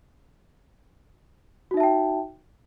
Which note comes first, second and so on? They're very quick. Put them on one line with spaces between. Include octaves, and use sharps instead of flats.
F#4 D#4 E5 A5 G5